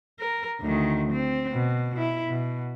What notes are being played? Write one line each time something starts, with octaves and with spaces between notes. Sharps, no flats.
A#4
D2 D#3
C4
B2
E4
B2